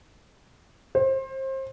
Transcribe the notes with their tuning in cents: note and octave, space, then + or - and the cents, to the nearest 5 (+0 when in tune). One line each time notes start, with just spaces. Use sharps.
C5 +30